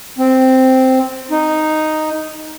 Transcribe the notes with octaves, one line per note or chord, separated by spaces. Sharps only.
C4
D#4